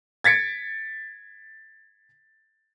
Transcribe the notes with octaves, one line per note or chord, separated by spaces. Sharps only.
G#6 A6 B6 C#7 D7